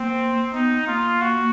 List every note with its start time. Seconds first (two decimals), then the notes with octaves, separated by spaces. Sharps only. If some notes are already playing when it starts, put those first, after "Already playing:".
Already playing: A#3 C4
0.53 B3 D#4
0.87 A#3 F4
1.21 F#4